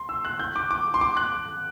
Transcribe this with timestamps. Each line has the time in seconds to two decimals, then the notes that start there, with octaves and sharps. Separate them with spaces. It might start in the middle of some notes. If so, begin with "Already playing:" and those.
Already playing: C6
0.09 E6
0.25 F#6
0.40 G6
0.56 D6
0.71 D6
0.94 C6
1.01 D6
1.17 F#6